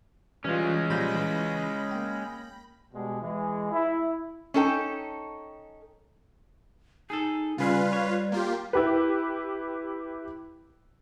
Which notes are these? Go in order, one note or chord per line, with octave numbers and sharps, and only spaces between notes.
E3 G3 G#3 C#4 F4
A#2 F3 G3 B5 G6 A#6
E3
A#3 G5
B2 G3 G#3
E3 G#3
E4
C#4 D#4 A4 G5
D#4 G#4 A4
C#3 G3 F4 G#4 B4 F5
C#5
A#3 F4 G4
E4 G4 B4